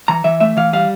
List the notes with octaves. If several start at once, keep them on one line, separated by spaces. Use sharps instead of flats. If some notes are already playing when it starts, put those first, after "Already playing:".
E3 A#5
E3 E5
A3 E5
E3 F5
G3 F5